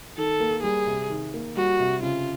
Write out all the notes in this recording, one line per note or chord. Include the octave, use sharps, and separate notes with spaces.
D#3 A4
A#3
G3 G#4
C3
D#3
A#3
G3 F#4
C3
C#3 F4